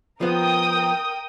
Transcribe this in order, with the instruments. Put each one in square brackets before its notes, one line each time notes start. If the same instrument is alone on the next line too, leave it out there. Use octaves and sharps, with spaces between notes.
[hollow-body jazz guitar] F3 B3 [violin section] A#4 G5 D#6